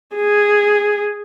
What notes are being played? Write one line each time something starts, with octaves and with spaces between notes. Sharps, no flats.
G#4